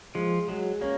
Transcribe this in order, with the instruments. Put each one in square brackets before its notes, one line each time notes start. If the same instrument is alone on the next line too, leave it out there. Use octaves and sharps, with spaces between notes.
[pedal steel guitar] F3 [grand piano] G#3
[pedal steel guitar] F#3 [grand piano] G#3
[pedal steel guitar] A#3 [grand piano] C#4